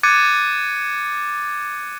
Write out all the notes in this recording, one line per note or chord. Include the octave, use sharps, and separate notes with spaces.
D6 F#6 G#6 A6 C#7 D#7